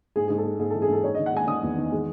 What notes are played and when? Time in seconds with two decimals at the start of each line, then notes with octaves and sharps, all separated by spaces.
0.16 G#2 G#4
0.28 G#2 G#4
0.38 A4
0.45 G#3
0.59 G#2 G#4
0.70 E3 A4
0.82 G#4
0.88 G#2 A4
1.04 D#4 C#5
1.14 D#3 D#5
1.26 F#5
1.33 G#3 G#5
1.48 D#3 D#6
1.63 E2
1.78 D#3
1.92 G#3